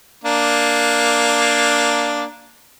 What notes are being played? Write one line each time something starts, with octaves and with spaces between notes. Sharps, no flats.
A#3 D4